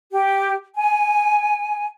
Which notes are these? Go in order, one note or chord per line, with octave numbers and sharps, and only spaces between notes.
G4
G#5